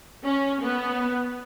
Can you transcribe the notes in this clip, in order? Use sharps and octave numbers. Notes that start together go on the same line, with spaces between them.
C#4
B3